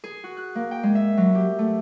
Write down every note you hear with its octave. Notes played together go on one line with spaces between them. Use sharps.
G#4
F#4
F#6
A#3
G5
G#3
E5
F#3
G4
A3